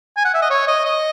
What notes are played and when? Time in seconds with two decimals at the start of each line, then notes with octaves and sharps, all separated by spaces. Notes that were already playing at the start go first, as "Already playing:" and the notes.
0.17 G#5
0.25 F#5
0.34 E5
0.42 D#5
0.50 C#5
0.67 D#5
0.85 D#5